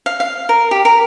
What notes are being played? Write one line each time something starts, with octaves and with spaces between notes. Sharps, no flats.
F5
F5
A#4
G4
A#4